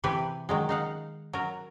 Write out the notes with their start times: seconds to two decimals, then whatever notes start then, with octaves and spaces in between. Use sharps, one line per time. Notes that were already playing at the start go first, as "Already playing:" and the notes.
0.04 C3 E3 G4 B4 G#5
0.49 D#3 F#3 G#3
0.69 D#4 F5 F#5
1.33 F#3 A#4